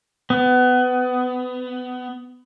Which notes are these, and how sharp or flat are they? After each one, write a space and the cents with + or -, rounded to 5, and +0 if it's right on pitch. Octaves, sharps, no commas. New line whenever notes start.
B3 +25